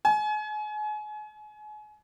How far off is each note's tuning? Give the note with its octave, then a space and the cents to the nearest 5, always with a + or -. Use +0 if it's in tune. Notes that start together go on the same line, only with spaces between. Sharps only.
G#5 +35